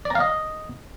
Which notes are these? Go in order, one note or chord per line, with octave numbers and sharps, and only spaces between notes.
D5
A#5
F5
D#5